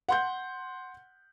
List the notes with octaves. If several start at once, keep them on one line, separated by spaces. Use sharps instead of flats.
F#5 C6 G6